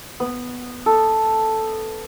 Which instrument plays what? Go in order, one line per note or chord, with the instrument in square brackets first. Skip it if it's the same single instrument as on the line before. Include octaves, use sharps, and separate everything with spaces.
[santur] B3
A4